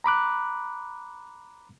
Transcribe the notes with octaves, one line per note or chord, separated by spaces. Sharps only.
A#5 B5 D6 F#6